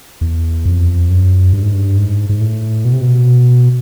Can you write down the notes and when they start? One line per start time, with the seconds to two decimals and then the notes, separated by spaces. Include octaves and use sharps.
0.21 E2
0.66 F2
1.10 F#2
1.53 G2
1.63 G#2
1.73 G2
1.97 G#2
2.29 G#2
2.41 A2
2.85 B2
2.93 C3
3.01 B2